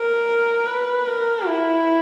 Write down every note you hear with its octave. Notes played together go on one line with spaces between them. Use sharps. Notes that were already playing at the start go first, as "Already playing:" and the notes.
Already playing: A#4
B4
A#4
E4